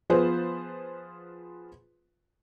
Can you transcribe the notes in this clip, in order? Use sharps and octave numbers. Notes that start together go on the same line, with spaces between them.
F3 B3 F4 G#4 B4 C5